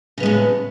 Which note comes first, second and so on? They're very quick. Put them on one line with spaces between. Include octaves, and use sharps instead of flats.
C#3 B3 G#3 A2